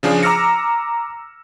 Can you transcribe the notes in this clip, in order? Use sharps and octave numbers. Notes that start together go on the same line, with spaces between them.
C#3 F3 D4 G#4
A#5 D6 E6 F6 A#6 C#7